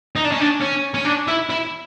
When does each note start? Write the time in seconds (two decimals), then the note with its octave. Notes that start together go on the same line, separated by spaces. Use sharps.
0.16 D#4
0.25 D4
0.32 C#4
0.40 D4
0.60 C#4
0.94 C#4
1.05 D4
1.28 E4
1.50 E4